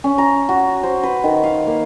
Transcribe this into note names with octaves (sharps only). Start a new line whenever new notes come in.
C#4
A#5
F#4
C5
B4
D#3
F5
A#3